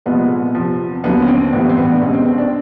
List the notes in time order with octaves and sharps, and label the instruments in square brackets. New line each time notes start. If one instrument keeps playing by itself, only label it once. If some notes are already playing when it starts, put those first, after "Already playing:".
[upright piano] C2 A#2 F3 G#3 B3
E2 C3 F3
D#2 D3 F#3 B3
C#4
C4
A#1 A2 E3 G3 B3
C4
B3
D4
C2 B2 G#3 C#4
C4
C4
D4